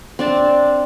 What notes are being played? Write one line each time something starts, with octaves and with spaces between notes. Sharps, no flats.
C4 D4 A5